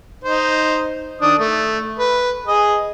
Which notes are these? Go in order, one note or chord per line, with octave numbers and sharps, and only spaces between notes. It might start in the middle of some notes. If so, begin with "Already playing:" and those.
D#4 C5
D#3 D4 D#6
A3
B4
G#4 D#5